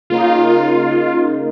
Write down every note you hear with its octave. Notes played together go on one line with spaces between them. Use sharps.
C#3 A#3 D#4 F4